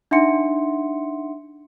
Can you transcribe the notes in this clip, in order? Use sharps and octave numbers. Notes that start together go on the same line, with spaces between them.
D4 D#4 E5 F#5 C6 C#7